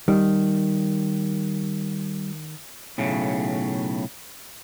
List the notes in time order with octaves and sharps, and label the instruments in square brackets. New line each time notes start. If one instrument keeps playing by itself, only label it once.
[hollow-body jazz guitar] D#3 [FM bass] G3
[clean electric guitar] B1 A2 C#3